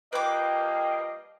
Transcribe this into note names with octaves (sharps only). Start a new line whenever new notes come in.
F3 G3 A#3 B4 D#5 G5 D6